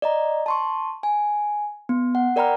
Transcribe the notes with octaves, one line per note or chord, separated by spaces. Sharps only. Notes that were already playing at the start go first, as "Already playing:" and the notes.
D5 D#5 A#5
A5 C6 C#6
G#5
B3
F#5
A#4 D5 G5 A#5 B5 F6